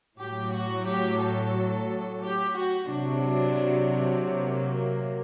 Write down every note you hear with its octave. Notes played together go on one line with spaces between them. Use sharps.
A2 F#3 G4
F#4
G4
A4
G4
F#4
C3 F#3 D4
A#3